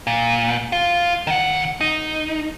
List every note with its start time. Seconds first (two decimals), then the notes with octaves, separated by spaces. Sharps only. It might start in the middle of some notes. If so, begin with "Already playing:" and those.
0.07 A#2
0.72 F4
1.27 D#3 F#5
1.81 D#4